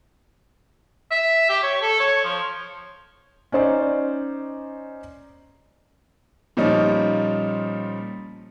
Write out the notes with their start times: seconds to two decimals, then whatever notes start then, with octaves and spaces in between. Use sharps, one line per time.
1.11 E5
1.49 G4
1.63 C#5
1.82 A4
2.00 C#5
2.24 F3
3.52 C#4 D#4 C5 D5
6.57 A#2 F3 G3 C#4 D#4